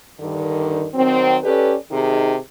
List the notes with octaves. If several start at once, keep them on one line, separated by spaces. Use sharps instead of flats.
G2 D3 D#3
D#3 F#3 C4
C#4 G4 A4 B4 D5
C3 D#3 D#4 G#4